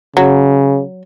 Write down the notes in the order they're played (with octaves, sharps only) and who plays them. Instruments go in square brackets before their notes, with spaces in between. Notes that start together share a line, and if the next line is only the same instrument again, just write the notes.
[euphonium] C#3 [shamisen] F#3